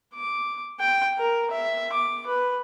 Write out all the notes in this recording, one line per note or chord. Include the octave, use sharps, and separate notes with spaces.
D6
G5
A#4
E5
D6
B4